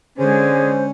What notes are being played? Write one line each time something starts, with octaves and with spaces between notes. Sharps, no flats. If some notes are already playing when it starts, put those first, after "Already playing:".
D3 G#3 C#4 G#4 C5